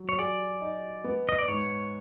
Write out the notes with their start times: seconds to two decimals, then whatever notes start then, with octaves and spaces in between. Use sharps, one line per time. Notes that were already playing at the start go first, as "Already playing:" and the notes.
Already playing: F#3
0.09 C#5
0.18 G#4 D5
0.61 D#4
1.04 B3
1.29 D#5
1.39 D5
1.48 G#2 C#5